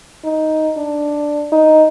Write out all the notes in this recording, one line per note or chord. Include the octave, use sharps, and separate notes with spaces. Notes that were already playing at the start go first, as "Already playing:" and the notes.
D#4
D4
D#4